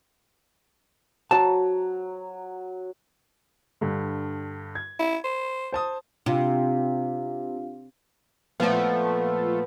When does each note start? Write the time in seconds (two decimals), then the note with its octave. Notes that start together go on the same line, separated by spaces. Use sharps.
1.31 F#3 A5
3.81 G2 D3
4.75 G#6
5.00 E4
5.24 C5
5.72 C5 A5 D#6
6.26 C3 D4 F4 F5
8.60 A#2 F3 A3 B3